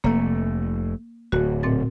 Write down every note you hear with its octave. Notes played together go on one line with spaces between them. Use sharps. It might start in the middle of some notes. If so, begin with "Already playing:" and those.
F1 A3 A#3
D1 F#4
A#2 C4 A6